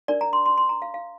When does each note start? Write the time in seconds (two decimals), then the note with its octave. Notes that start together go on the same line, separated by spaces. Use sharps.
0.08 D4 A#4 D5
0.21 A#5
0.33 C6
0.46 C6
0.58 C6
0.69 A#5
0.82 F5
0.94 F5